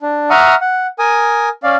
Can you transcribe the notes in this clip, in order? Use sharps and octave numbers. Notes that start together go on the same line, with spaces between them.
D4
E5 F#5 A#5 C#6 D#6 F6
F#5
A#4 G#5 D#6
C#4 D5 F5